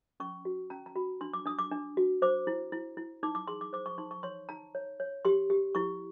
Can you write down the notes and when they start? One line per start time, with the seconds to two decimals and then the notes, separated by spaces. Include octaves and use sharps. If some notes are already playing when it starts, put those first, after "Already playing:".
0.20 C#4 C#6
0.45 F#4
0.70 C#4 A#5
0.86 A#5
0.95 F#4 B5
1.21 D4 C6
1.34 D6
1.46 D4 D#6
1.59 D6
1.71 D4
1.97 F#4
2.22 C5 D6
2.47 E4
2.72 E4
2.97 E4
3.23 D#4 D6
3.35 D6
3.48 G#4 C6
3.61 D6
3.73 C5 D6
3.86 C#6
3.98 D#4 C6
4.11 C#6
4.23 C#5 C6
4.49 D#4 A#5
4.75 C#5
5.00 C#5
5.25 G4 C6
5.50 G4
5.75 E4 C#6